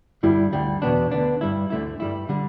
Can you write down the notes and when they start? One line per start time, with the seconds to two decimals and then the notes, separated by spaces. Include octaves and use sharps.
0.23 G2 D3 G3 E4
0.53 D2 D3 G3
0.82 E2 B2 B3 D4
1.11 D2 D3 B3 D4
1.41 G2 G3 E4
1.70 D2 D3 A3 E4
2.00 G2 G3 E4
2.29 D3 G3